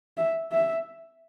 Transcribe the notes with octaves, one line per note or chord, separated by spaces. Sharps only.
E5
E5